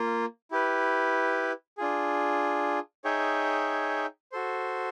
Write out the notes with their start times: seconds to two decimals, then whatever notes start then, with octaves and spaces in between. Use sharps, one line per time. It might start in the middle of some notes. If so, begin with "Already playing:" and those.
Already playing: A#3 F4
0.51 E4 G4 B4
1.78 D4 F4 G#4
3.04 D#4 G#4 C#5 E5 G5
4.32 F#4 A4 C5